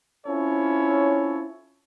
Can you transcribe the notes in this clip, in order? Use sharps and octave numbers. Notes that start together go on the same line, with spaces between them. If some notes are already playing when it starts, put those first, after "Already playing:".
C4 C#4 E4 F4 A4 C#5